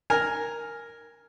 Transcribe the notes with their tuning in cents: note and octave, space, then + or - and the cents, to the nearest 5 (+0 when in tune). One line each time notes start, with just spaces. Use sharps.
A#4 +0 G#5 +0